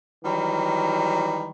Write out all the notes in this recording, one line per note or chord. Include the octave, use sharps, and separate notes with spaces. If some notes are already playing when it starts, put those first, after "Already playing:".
D#3 E3 F#3 G3